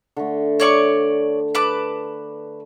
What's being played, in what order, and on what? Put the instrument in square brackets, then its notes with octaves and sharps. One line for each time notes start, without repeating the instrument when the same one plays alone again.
[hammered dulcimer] D3 A3
[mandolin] C#5 D5 C#6
B4 A5 D6